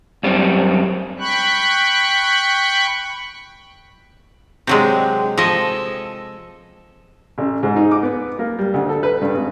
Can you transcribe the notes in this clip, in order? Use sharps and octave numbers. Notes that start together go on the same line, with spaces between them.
F#2 G3 C4
G5 B5 C#6 F#6
C3 F#3 G#3 D4 G4 G5
F3 A4 D#5 G#5
A1
G#2
D#4
D6
B3
A#3
G3
D2
A4
B4
G2
G#1